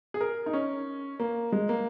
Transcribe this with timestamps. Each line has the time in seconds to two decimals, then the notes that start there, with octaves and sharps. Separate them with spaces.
0.14 G#4
0.21 A#4
0.46 D#4
0.53 C#4
1.20 A#3
1.52 G#3
1.69 A#3